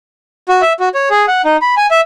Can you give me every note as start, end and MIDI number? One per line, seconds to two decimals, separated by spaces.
0.49 0.62 66
0.62 0.73 76
0.80 0.89 66
0.94 1.09 73
1.10 1.26 68
1.28 1.42 78
1.45 1.57 63
1.62 1.75 83
1.77 1.87 80
1.91 2.01 76